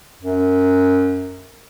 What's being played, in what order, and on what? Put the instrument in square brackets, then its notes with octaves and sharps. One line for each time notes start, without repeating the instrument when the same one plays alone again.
[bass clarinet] F#2